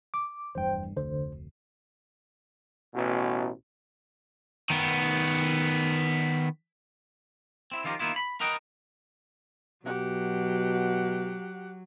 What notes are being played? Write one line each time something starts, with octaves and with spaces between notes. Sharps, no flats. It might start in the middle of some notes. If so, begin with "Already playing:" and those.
D6
F1 E2 G2 C5 G5
F1 D2 D3 C5
A1 B2
D#3 B3
C4 E4
D#3 F3 F4 G4 A#4
D#3 A#3 B3 E4 F4
B5
A#4 B4 D#5 F#5 G5
B2 F#3 G4 F#5